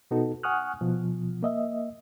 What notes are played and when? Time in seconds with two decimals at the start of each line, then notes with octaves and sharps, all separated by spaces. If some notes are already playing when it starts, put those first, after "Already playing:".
0.11 B2 B3 D#4 F#4 A4
0.43 F#5 G#5 C#6 D#6 F6 F#6
0.81 B2 F3
1.43 A#3 D#5 E5